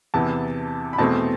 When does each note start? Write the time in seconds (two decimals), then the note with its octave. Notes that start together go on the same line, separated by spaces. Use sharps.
0.14 E2 C3 E3 B3 A5
0.93 B5
0.98 E2 B2 A3 C4 A5